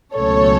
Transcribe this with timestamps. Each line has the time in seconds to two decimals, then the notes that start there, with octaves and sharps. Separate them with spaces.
0.15 C#2 B2 F#3 A3 C#4 A4 C#5